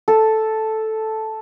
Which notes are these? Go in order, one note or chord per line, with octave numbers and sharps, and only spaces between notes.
A4